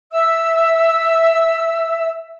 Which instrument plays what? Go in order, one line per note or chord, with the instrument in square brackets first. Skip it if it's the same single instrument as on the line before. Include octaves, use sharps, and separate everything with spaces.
[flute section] E5 E6